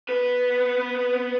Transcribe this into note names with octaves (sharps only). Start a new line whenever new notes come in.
B3 B4